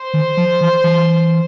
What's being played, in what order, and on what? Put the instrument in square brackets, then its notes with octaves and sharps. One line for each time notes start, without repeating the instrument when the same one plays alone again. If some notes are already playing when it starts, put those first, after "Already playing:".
Already playing: [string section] C5
[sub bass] D#3
F3
E3
E3